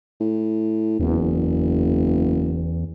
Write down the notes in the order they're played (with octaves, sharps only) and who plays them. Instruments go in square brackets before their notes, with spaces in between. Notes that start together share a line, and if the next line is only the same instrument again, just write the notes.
[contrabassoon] A2
[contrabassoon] F#1 [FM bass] E2